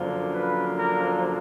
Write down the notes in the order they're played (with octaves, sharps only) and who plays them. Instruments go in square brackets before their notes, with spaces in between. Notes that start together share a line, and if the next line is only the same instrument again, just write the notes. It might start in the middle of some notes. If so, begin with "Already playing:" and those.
Already playing: [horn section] F#2 D3 F3 A#3
B4
A#4